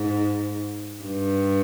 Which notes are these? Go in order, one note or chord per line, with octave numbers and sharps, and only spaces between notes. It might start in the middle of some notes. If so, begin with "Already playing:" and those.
Already playing: G#2
G2